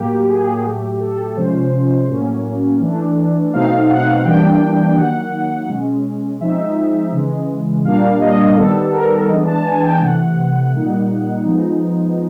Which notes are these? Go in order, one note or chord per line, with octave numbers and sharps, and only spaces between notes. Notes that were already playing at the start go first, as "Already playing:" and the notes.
Already playing: A2 F#3 A#3 G4
G#4
F#4
A2 F#3 A3 G4
A4
C3 F3 G#3 C#4 C5
A2 F#3 A#3 C#4
E3 A3 D4
B2 F#3 A3 C4 D#4 F5
F#5
E3 G3 A#3 D4 G5
D#3 F#3 A#3 F#5
B2 G#3 C#4
F3 G#3 C4 D#4 E5
C#3 E3 G#3
A#2 G3 A#3 D4 F5
D#5
D#3 G3 B3 A4
A#4
E3 G#3 B3 D4 D#5
A5
G#5
G5
C3 E3 A3 F#5
A#2 G3 A#3 D#4 F#5
F3 G#3 B3 D#4